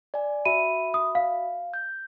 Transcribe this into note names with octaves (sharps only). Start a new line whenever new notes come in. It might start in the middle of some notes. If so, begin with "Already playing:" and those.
D5 G#5
F#4 E5 B5 D#7
D#6
F5
G6